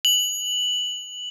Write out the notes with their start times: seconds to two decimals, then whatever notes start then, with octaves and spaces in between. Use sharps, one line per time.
0.05 F#7